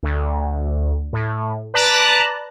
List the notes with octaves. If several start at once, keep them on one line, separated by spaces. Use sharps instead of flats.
D2
A2
B4 D5 A5 A#5 F#6